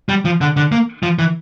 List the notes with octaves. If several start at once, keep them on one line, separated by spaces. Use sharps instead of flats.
G3
F3
D3
D3
A#3
F3
E3